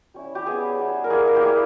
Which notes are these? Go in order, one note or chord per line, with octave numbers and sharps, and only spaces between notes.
G3 C#4 E4
G4
G3 B3 E4 G#4
G3 B3 E4
A#4
G3 A#3 E4 G#4
A#4
G4
G3 A#3 E4 G#4